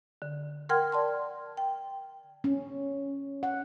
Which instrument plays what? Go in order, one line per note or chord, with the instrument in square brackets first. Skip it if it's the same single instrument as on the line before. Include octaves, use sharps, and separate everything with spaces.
[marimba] D3
A#4 F#5 G5 C6 F6 G#6
D5 A5 C6
G5
[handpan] C#4
F#5